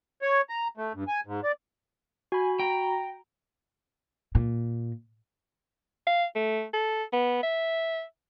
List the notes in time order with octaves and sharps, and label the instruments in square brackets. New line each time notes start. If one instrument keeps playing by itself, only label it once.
[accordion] C#5
A#5
A3
G2
G#5
G#2
D5
[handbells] F#4 B5 [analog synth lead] G#5
[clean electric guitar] G5 [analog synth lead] A#5
[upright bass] A#2
[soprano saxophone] F5
A3
A4
B3
E5